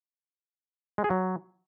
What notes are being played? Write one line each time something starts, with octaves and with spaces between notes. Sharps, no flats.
G#3
G#4
F#3